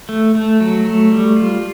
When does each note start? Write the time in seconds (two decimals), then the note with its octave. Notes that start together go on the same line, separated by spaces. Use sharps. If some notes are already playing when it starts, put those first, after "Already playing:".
0.09 A3
0.35 A3
0.61 F#3
0.86 A3
1.12 G3
1.37 F4